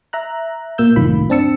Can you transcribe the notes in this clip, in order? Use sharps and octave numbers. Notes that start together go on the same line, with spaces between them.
E5 A#5 F#6
A#2 A#3 E6 G6
C2 F#2 A2 D#3 F4 B5
C4 D4 A5 E6 C#7